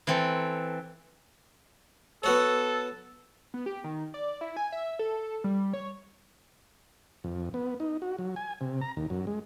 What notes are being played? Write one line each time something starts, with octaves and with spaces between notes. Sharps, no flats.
E3 C4 A4
B3 F#4 A4 C#5
B3
G4
D#3
D5
E4
G#5
E5
A4
G3
C#5
F2
B3
D#4
F#4
F#3
G#5
C3
A#5
D#2
F#2
G#3